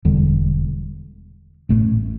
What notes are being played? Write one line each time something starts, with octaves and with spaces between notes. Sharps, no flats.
E1 E2 D3 G3
A1 A2 A3